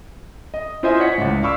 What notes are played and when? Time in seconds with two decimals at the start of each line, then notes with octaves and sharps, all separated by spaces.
0.54 D#5
0.83 E4 F4 C5 D#5 E5 G#5
1.00 C#5 F#5 B6 C#7
1.18 C#2 A2
1.42 D5 F5 B5 C#6 D6 E6